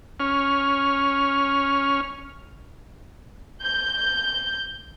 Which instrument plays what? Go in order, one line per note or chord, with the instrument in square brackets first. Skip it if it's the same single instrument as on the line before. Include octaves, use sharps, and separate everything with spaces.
[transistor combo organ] C#4 F6
[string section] G6